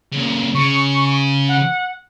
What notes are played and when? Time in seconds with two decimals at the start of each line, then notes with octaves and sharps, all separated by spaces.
0.13 A#2 C#3
0.55 C#3 C#6
1.48 F#5